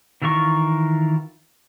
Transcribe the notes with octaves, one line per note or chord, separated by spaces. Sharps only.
D#3 E3 F4 A#4 C#6